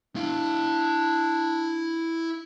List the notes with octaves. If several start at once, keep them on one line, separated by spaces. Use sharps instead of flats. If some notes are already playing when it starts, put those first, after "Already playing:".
D4 E4 F5